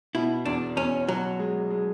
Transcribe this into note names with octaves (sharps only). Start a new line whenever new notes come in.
B2 E4
E2 D4
E2 C#4
B2 F#3
G#3
G#3